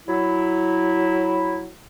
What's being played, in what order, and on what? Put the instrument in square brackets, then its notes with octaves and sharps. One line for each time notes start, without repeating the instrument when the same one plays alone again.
[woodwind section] F#3 E4